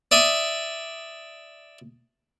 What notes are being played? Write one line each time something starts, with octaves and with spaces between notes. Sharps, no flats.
D5 E5 D#6